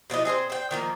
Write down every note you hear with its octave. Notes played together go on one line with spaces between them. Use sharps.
B2 F3 E4 D#5
C4 G#4 A#4 C5
C5 G5
D#3 F3 A#3